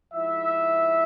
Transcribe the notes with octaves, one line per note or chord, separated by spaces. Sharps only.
G#2 F3 E4 E5